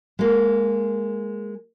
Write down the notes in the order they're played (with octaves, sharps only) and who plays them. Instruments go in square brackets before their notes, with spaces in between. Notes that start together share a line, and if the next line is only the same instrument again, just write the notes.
[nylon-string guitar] G#3 A#3